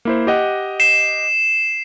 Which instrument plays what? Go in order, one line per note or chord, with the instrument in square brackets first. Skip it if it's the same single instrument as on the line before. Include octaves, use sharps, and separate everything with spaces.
[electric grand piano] A#3 E4 C5
G4 D#5 F#5
[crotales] C7 E7